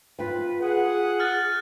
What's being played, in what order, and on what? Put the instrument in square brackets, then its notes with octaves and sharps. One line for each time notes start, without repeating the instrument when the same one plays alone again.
[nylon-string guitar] F4 G5 [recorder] B4
[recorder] G#4 [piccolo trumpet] F#5
[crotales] F6 F#6 A6